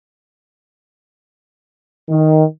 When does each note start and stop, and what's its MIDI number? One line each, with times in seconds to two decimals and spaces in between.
2.09 2.43 51